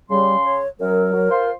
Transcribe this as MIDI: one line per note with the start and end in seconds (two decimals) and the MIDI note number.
0.10 0.60 49
0.10 0.36 55
0.10 0.60 84
0.44 0.68 73
0.80 1.09 42
0.80 1.09 54
0.80 1.50 70
1.13 1.27 54
1.30 1.51 65
1.30 1.51 72
1.30 1.51 84